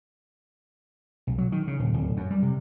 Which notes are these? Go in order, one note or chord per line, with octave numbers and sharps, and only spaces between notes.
B1
F#3
D#3
C#3
D#1
D1
F#2
G3
C3